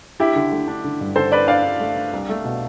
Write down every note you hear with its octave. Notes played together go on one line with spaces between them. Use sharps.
D4 E4 G4
D3
A3
D4
D3
G2
D3 A4 C5
D4 B4 D5
D4 D5 F5
D4
A3
D4
C2
A3
B2